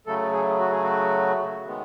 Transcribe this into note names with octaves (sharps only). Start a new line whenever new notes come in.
C#3 F#3 A3 A4
G#4
F#4
G#4
F#4
D#3 G#3 B3